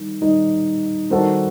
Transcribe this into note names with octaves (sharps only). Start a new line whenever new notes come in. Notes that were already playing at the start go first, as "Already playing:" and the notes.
Already playing: D#3 G3 D#4
D#3 G3 D#4
D#3 G3 C4 F#4 A4